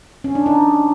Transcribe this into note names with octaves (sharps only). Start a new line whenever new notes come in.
C#4
D4
D#4